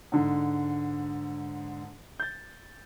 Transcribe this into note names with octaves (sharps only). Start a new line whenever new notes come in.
G#2 D3
G6 A6